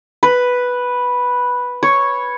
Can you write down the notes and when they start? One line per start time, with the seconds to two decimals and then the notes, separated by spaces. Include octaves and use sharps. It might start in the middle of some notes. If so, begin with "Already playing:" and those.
0.23 B4
1.83 C#5